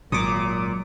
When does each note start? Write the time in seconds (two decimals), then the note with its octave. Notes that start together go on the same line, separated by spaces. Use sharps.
0.12 G#1 A#2 F#3 D6 D#6